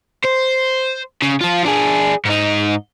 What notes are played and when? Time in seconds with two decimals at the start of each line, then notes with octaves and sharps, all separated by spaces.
0.24 C5
1.22 C#3
1.41 F3 F4
1.65 D4 G#4
2.25 G#2 D#4